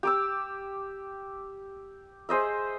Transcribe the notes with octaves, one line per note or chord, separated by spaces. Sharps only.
G4 D6 E6
G#4 C5 D#5 E5